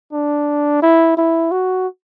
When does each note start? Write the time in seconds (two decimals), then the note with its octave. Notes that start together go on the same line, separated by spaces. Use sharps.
0.13 D4
0.82 E4
1.17 E4
1.51 F#4